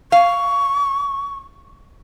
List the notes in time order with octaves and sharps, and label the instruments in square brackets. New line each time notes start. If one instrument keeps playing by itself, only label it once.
[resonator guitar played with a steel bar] F5 [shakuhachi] C#6